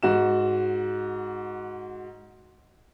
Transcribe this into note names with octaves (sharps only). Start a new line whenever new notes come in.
G#2 F#4 E7